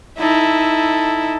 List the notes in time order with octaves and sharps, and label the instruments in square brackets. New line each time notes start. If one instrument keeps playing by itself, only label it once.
[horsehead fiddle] D#4 [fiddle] E4 [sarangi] A4